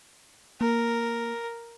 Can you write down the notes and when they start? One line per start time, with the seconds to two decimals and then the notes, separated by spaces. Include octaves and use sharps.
0.61 A#3 A#4